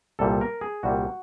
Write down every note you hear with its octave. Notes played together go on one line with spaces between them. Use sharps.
C2 A#2 G3 A4
A#4
G#4
C2 A#2 G3 F#4